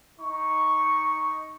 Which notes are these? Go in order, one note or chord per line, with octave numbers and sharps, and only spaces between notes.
D#4 C#6